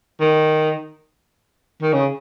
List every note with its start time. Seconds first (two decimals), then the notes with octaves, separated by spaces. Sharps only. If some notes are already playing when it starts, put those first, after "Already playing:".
0.20 D#3
1.82 D#3
1.93 C#3